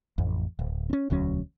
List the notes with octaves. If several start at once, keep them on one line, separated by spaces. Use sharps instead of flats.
A1 F2
D1
C4 C#4
E1 D2 F#3 C#4